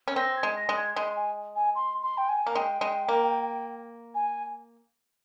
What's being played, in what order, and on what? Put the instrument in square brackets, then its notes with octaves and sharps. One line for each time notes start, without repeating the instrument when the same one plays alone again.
[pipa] C#4
[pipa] C4 [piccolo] A#6
[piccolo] G#6
[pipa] G#3
[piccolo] A#6
[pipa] G#3
[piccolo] G#6
[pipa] G#3 [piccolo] C6
[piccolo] G#5
G#5
C6
C6
G5
G#5
[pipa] A#3
[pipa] G#3 [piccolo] G5
[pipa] G#3
A#3
[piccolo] G#5